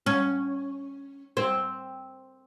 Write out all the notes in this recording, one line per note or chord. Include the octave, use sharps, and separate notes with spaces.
C#4
C4